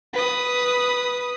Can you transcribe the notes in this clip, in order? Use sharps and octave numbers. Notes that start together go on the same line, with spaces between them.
B4 D#6